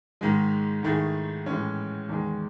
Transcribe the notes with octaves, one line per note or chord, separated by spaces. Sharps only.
G#2 D#3 G#3
G#2 D#3 A3 E4 G#4
A2 E3 G#3 C#4
E2 D#3 G#3